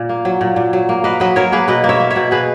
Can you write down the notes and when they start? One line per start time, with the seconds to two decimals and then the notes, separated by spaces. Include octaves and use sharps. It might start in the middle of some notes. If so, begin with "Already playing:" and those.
Already playing: A#2
0.09 A#3
0.25 F#3
0.41 A#2
0.56 A#2
0.73 F#3
0.89 A#3
1.04 A#3 B4 D#5
1.20 F#3 B4 D#5
1.36 F#3 A#4 C#5
1.52 A#3 G#4 B4
1.68 B2 B4 D#5
1.84 A#3
1.89 C#5 E5
2.00 A#3
2.10 C#5 E5
2.16 B2
2.31 B2 G#4 B4